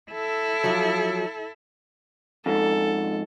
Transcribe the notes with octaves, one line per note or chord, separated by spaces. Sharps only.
E4 A4
F3 F#3
F2 G#2 A4